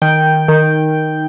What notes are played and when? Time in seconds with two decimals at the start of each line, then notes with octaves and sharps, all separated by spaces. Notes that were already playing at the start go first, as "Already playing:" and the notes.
0.02 D#3 G5
0.48 D#3